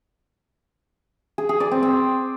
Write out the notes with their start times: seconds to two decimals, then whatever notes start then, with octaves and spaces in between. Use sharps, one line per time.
1.38 G#4
1.49 G#4
1.60 D5
1.71 C4
1.83 C4